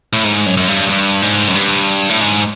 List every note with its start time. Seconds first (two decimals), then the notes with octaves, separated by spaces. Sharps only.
0.13 A2
0.24 G#2
0.46 F#2
0.57 F#2
0.68 G2
0.89 G2
1.22 G#2
1.48 F#2
1.55 G2
2.09 A2
2.21 G#2